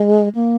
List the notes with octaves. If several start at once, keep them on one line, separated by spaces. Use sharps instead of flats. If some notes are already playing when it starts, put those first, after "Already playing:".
Already playing: G#3
A#3